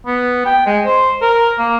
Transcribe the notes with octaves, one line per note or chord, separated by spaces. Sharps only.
B3
G5
G#3
C5
A#4
A#3